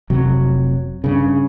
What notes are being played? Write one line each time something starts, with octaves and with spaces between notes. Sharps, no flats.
F1 C3 F#3
G2 C#3